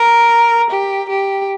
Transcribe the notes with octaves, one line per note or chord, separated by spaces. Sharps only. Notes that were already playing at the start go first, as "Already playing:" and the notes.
Already playing: A#4
G4
G4